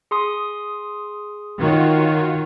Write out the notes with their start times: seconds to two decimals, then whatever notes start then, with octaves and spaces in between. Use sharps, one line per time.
0.11 G#4 C6 D#6
1.59 D#3 F4 F#4 C#5